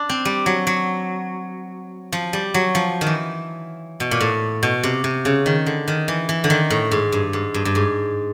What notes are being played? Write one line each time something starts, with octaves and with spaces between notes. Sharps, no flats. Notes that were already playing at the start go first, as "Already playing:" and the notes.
Already playing: D4
C4
G3
F#3
F#3
F3
G3
F#3
F3
D#3
E3
B2
A#2
A2
B2
C3
C3
C#3
D#3
D3
D#3
E3
E3
D3
D#3
A2
G#2
G2
G#2
G2
G2
G#2